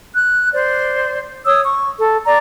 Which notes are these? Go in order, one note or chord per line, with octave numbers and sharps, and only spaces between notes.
F#6
C5 D5
C#5 D#6 E6
C#6
A4
D5 A#5